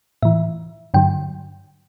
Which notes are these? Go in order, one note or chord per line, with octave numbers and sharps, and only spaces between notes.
A2 E3 E5
G2 D3 F#3 G5